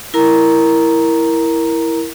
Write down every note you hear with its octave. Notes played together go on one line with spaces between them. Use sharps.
E4 A#4 A#5